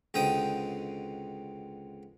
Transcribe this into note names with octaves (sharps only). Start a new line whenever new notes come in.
C#2 B2 D3 C4 G5 D#6